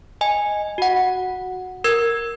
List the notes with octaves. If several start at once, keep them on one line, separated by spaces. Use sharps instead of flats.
D#5 G#5
F#4 F#5
A#4 E6 G#6